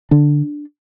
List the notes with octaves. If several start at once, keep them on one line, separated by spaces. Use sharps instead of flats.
D3 D4